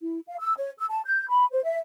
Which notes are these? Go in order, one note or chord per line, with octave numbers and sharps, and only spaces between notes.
E4
F5
E6
C#5
E6
A5
G6
B5
C5
E5